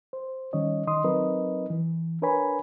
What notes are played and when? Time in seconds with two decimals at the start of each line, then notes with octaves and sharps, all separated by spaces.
0.13 C5
0.53 D#3 G3 C#4 C#5 D#5
0.87 D#3 D#5 C6 D#6
1.04 F#3 C4 D#4 A#4 B4 D#5
1.70 E3
2.22 D4 A#4 B4 C#5 G#5 B5